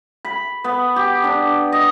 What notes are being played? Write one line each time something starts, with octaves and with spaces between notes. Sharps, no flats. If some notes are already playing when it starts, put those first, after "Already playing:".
B5
B3
G4
D4
D#5